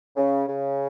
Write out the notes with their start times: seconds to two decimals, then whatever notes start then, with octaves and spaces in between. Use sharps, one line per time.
0.17 C#3
0.48 C#3